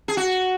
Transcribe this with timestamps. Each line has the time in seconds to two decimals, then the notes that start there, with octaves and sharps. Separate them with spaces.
0.08 G#4
0.17 F#4